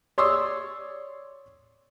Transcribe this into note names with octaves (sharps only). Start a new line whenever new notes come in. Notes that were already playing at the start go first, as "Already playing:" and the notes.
C#5 D5 C6 C#6 D#6 E6